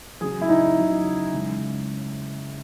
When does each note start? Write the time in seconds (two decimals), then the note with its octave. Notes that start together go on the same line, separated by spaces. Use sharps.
0.21 C#3 F#3 G#4
0.41 E4
0.49 D#4
0.77 C#3 F#3
1.33 C#3 G#3